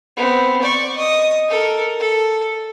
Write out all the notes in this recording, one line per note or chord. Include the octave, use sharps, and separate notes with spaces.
B3 C4
D5 C#6
D#5 D#6
A4 A#4
A4